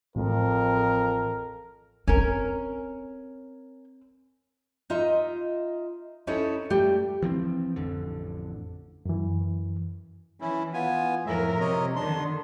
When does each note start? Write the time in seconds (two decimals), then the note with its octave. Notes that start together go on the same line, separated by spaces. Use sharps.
0.16 A1 F2 A#4
2.08 C4 C#4 A#4
4.90 D#4 F4 D#5 E5
6.27 C#4 D#4 E4 A4 C#5
6.70 G3 A3 G4
7.22 E3 F3 A#3 C4
7.76 A1 F2 D3
9.05 F#2 E3
10.41 E3 C#4 E4
10.74 B3 F4 G#5
11.26 F2 A2 A#4 E5
11.60 C3 A#4 C#5 D#5
11.96 D3 D#3 D4 C6